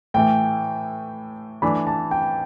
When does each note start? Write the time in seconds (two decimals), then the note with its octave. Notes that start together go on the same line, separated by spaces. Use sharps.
0.14 A2 E3 A3 G5
1.62 E3 A3 D4 B5
1.87 A5
2.11 G5